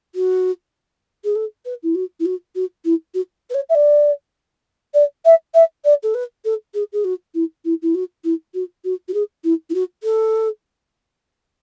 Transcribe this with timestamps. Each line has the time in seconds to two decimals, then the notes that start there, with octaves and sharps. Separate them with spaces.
0.15 F#4
1.24 G#4
1.35 A4
1.65 B4
1.83 E4
1.95 F#4
2.19 E4
2.25 F#4
2.55 F#4
2.84 E4
3.14 F#4
3.49 B4
3.54 C#5
3.69 E5
3.75 D5
4.94 D5
5.25 E5
5.54 E5
5.84 D5
6.03 A4
6.14 B4
6.44 A4
6.74 G#4
6.92 G#4
7.04 F#4
7.34 E4
7.64 E4
7.82 E4
7.94 F#4
8.24 E4
8.54 F#4
8.84 F#4
9.08 F#4
9.13 G#4
9.44 E4
9.69 E4
9.74 F#4
10.03 A4